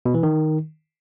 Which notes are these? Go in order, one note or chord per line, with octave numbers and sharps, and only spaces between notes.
B2
E3
D#3